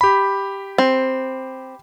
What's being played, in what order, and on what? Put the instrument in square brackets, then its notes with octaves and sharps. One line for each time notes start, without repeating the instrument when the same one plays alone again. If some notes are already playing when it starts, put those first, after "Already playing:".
[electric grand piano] G4 B5
[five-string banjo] C4